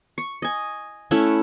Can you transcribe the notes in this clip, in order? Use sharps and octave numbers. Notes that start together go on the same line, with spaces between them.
C#6
D#5 G#5
A3 C#4 E4 F#5